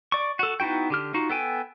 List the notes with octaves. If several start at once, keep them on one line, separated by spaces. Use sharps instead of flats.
D5 C#6
F#4 A4
B3 D#4 E4 F#4 G5
D3 G4 F6
D#4 F4 F#4
B3 A4 G5 G#5